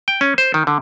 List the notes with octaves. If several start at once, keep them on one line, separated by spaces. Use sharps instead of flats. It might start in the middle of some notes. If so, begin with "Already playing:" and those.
G5
C#4
C5
D#3
D3